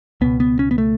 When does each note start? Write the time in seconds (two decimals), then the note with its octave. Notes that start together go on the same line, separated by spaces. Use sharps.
0.21 C#2 B2 B3
0.40 B3
0.59 C#4
0.71 B3
0.78 A3